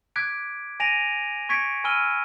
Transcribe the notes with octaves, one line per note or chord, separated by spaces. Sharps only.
D6 F#6 G#6 B6 D7
G#5 A#6 D7 D#7 F7
C#6 G#6 B6 C#7 D7
G#5 B5 E6 F6 D#7 G7